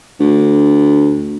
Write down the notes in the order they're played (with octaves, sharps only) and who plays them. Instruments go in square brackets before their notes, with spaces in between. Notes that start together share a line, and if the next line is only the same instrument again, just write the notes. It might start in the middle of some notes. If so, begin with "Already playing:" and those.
[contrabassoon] D2